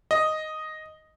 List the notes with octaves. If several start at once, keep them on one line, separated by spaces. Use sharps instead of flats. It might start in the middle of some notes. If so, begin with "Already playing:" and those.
D#5